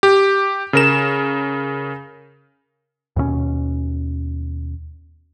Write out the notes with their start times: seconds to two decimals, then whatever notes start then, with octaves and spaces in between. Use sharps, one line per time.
0.03 G4
0.73 C#3 A#4 E7
3.16 D#2 B2 A3 C#4